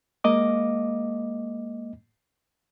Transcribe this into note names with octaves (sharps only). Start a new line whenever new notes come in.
G#3 A#3 D#5 D6